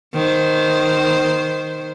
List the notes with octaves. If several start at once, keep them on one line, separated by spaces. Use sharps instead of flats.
D#3 C5